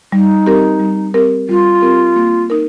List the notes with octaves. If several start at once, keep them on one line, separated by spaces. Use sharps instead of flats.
G3 D#4
C4 G4 A#4
G3
C4 G4 A#4
G3 F4
C4 G4 A#4
A#3
D#4 A#4